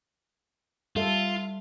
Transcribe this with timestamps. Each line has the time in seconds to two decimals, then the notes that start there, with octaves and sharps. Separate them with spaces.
0.96 G3 F4 A4 E5